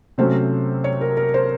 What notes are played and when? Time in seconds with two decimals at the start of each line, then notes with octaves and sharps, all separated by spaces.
0.18 C3 F#3 A3 C#4 C5
0.84 C#5
1.01 A#4
1.17 A#4
1.34 C5